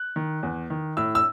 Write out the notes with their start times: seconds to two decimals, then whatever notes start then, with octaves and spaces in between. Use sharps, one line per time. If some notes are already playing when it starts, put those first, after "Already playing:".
Already playing: F#6
0.16 D#3
0.43 E2
0.70 D#3
0.97 A2 E6
1.15 E6